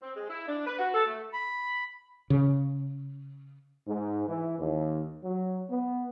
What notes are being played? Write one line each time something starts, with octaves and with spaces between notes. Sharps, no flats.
C4
G#3
E4
D4
B4
F#4
A4
A3
B5
C#3
G#2
E3
D#2
F#3
B3